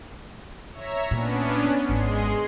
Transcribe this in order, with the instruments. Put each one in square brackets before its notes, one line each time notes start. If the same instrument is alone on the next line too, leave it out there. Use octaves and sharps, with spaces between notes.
[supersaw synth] C#5 E5 A#5
[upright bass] A#2 [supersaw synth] B3 C#4 D4
[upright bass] G#1 D#4 [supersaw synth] G#3 G#4 C6